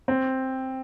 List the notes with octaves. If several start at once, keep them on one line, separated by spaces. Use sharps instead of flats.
C4